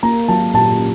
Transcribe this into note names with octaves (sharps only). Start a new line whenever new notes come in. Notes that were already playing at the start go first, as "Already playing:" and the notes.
A#3 A#5
F#3 A5
A#2 A5